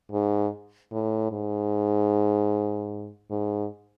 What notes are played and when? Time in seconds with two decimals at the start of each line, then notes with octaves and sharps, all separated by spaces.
0.12 G#2
0.92 A2
1.32 G#2
3.30 G#2